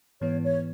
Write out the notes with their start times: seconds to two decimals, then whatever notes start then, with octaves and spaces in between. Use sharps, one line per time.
0.21 G#2 E3 B3 C#5
0.43 C#5